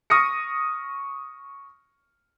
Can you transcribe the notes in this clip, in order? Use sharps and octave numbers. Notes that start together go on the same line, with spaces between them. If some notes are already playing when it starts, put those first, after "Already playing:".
C#6 D#6 F6 A#6 C#7